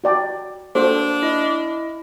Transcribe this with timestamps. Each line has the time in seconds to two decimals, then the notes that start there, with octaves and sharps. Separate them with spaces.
0.04 F#4 D5 G5
0.75 A#3 D4 F#4 A4 C5
1.22 E4 D#5